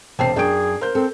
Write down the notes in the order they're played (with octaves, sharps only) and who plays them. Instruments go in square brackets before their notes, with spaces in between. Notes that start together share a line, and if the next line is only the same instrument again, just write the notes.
[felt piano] E1 A5 C7 [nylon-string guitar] C3 C4
[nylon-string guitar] F#2 G5 [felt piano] D4 D7 [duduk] G#4
[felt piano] A#4 C5 G6
[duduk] C4 [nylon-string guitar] A4